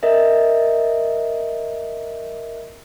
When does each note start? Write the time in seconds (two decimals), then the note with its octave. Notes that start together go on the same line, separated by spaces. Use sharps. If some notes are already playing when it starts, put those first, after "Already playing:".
0.03 A#4 D#5 E5